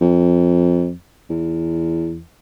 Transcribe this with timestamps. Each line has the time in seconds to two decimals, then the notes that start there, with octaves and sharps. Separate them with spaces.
0.01 F2
1.30 E2